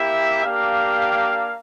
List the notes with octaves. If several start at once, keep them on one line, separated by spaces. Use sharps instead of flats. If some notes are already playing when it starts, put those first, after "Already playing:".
Already playing: A#3 E4 G4 E5
A#3 D4 G4 F5